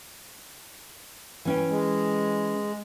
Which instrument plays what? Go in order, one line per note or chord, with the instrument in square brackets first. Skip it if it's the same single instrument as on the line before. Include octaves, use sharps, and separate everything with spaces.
[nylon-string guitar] E3 C#4 G5
[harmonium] G#3